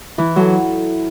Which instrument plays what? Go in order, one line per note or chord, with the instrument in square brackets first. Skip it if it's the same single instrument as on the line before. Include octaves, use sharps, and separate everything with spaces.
[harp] E3 [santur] E4
[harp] F#3 [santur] A4